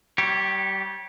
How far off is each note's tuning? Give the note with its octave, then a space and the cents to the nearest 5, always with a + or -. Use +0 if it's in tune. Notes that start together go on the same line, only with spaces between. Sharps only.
G3 -30 G4 +0 C#5 -20